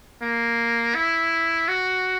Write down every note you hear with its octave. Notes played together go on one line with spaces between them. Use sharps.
A#3
E4
F#4